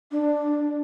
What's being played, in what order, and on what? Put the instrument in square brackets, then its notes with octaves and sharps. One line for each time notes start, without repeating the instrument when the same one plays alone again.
[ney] D4